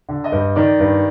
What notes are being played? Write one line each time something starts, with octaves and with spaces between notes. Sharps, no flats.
D3
D#5
G2
D#3 D5
G2